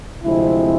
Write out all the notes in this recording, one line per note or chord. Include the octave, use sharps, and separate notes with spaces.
D2 C3 F3 G#3 C4 E4